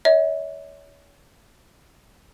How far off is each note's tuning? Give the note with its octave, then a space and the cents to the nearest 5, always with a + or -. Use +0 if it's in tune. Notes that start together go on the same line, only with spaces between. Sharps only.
C#5 +35 E5 -45